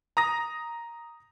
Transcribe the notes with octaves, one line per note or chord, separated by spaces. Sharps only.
A#5 D#6 A#6